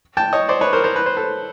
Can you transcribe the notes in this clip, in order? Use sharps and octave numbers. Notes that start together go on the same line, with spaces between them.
G5 A5
C#5 D#5
C5 D5
B4 C#5
A#4 C5
A#4 C5
B4
C5
A4 B4